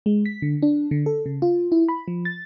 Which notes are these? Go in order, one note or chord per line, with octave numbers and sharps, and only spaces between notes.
G#3
B6
D3
D4
D3
A4
C#3
F4
E4
B5
F3
A6